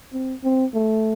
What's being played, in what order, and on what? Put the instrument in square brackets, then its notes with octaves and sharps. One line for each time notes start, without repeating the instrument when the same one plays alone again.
[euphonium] C4
C4
A3